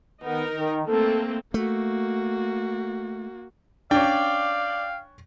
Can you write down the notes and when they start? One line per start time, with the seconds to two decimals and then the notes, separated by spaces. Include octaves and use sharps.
0.24 D#3 B3 D#4 A#4
0.56 D#3
0.88 A3 A#3 C4 A4
1.54 A3 A#3 F#4
3.91 C#4 D4 D5 F5 G5